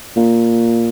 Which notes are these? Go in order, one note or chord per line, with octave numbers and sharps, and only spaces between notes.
A#2